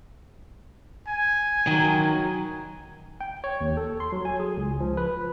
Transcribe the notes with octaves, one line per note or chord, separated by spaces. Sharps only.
G#5
D#3 F#3
G5
C#5
D#2
A4
C6
F#3
G#5
G#4
C#2
F3
B4